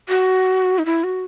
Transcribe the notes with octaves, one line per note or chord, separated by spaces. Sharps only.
F#4
D#4
E4
F#4